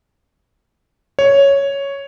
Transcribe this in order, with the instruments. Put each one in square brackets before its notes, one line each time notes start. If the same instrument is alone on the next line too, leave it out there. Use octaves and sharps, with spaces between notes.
[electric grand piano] C#5